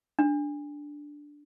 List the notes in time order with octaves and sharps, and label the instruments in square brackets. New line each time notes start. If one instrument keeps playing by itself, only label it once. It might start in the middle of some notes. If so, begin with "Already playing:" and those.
[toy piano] D4